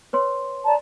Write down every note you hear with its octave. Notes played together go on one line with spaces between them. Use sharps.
B4 C#5 C6
D5 A5 A#5